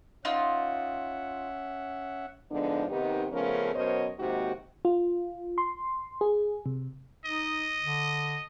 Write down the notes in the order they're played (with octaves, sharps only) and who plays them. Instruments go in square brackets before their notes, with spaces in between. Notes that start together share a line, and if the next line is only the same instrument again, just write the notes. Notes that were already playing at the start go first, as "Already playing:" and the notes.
[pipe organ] C#4 E5 F#5 [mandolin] D#4 F4
[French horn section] G#2 D3 F3 B3 D4 D#4
C3 D#3 B3 D#4 G4
C#3 F3 A3 B3 C#4 A#4
F#2 B2 A#4 C5 C#5 D#5
D#2 G#2 C3 D#4 F#4 G4
[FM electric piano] F4
C6
G#4
C3
[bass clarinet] D#4 [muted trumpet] D#5
[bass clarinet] D3